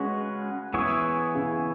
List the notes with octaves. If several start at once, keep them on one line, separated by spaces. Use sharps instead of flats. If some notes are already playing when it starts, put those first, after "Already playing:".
Already playing: C#3 G#3 C#4 F#4 B4
E3 B3 E4 G#4 C#5
C#3